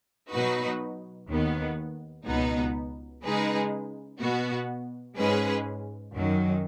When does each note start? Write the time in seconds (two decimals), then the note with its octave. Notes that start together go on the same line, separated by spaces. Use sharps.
0.31 B2 F#3 D#4 F#4 B4
1.28 D#2 D#3 B3
2.26 C#2 B2 B3 D#4
3.23 C#3 G#3 D#4 G#4 B4
4.19 B2 B3 F#4
5.16 G#2 G#3 C#4 G#4 B4
6.13 F#2 D#3 F#3